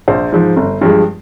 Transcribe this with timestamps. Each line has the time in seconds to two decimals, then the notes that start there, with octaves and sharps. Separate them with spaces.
0.08 A#1 C5
0.32 G#2 F3
0.57 G1
0.81 G2 F3 G#3